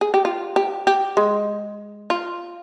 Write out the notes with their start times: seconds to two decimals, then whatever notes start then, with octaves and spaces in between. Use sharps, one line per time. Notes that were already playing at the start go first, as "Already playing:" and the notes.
0.01 G#4
0.14 G4
0.25 F4
0.56 G4
0.87 G4
1.17 G#3
2.10 F4